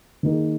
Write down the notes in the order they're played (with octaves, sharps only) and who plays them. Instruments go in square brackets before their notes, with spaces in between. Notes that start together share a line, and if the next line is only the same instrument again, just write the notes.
[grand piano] D#3 A#3 D#4 G#4